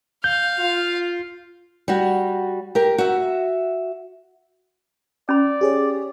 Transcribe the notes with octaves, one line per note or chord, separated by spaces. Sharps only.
F5 G6
F4
G3 F#4
G4 A#4
F#4 E5
C#4 D5 B5
G4 G#4 C#5